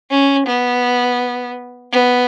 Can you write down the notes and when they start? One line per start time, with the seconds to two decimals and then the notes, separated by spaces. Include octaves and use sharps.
0.11 C#4
0.47 B3
1.92 B3